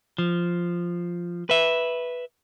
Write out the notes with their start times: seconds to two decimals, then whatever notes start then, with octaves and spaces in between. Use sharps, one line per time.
0.18 F3
1.50 B4 E5